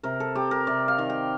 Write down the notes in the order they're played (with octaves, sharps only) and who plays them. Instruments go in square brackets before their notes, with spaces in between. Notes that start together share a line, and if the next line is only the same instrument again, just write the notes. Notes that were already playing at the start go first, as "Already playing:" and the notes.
[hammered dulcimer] C3 A#4
A4
C4 G4
A#4
C3 D5
F5
D#3
G5